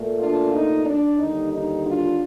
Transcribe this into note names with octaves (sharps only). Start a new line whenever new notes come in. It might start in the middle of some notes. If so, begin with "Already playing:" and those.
Already playing: A#2 A3
D4 F4
D#4
D4
D#2 D3 G3 D#4
D#4
D4 F4